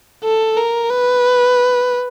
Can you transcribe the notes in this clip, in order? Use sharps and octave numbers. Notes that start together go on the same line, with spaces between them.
A4
A#4
B4